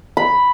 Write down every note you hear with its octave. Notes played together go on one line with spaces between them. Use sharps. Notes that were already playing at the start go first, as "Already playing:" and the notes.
B5